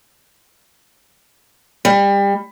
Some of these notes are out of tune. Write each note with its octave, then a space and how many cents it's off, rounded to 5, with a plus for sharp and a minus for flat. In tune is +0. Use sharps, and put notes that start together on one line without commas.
G3 +30